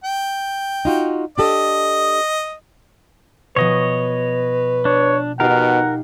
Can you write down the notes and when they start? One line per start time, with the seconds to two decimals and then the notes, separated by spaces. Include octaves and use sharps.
0.04 G5
0.85 D#4 F4 F#4
1.38 D4 G4 A4 D#5
3.56 B2 F3 B4 C#5 D#5
4.85 D4 C#5
5.40 B2 D#4 F4 G4 A#4 F#5